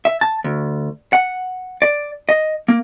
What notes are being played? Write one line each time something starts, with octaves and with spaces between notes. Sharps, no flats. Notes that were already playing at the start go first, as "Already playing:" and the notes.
E5
A5
D2
F#5
D5
D#5
A#3